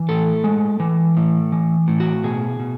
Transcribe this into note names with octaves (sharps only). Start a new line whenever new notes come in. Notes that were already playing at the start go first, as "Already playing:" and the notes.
Already playing: E3
A2 A4
G#3
E3
A2
E3
A2
F#4
B2 G#4
B2